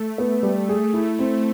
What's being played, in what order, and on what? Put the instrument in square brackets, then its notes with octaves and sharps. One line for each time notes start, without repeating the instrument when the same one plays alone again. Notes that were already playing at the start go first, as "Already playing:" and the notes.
Already playing: [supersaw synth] A3
[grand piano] B3
G3
G#4
E4
C4